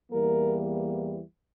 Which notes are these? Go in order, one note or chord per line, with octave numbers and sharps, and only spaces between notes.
E2 E3 G3 A#3 A#4